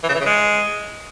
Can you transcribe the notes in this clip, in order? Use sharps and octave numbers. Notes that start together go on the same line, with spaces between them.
E3
C#3
E3
C#3
G#3